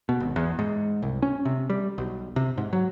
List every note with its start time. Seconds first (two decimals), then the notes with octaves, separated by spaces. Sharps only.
0.09 B2
0.20 G#1
0.36 E2
0.59 G#2
1.02 C2
1.22 C#4
1.45 C3
1.70 G3
1.98 B1
2.36 C3
2.58 G#2
2.73 F#3